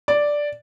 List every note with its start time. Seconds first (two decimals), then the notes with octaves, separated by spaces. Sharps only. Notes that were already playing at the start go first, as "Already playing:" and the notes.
0.08 D5